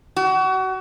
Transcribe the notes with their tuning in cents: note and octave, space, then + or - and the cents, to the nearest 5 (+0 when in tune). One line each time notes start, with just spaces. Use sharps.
F#4 +30